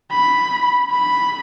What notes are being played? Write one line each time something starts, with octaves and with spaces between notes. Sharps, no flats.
B5
B5